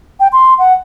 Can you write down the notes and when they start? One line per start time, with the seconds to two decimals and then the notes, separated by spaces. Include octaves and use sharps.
0.20 G5
0.33 C6
0.59 F#5